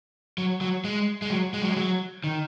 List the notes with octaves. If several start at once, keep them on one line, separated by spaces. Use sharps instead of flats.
F#3
F#3
G#3
G#3
F#3
G#3
F#3
G#3
F#3
D#3